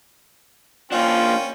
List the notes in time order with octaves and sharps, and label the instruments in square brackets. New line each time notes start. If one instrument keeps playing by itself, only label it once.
[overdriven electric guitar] A#3 D4 [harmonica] C#4 G5 [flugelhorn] F4